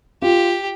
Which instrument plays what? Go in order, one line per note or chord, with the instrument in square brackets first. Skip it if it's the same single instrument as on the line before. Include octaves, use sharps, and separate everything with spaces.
[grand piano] F4 [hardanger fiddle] G4